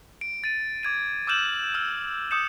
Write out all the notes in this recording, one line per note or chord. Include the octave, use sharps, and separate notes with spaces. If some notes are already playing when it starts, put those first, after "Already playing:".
D7
A6 D#7
D6 G#6 D#7
D6 E6 F6 G6 E7 F#7
E6 F6 E7
D6 D#6 G6 C#7 E7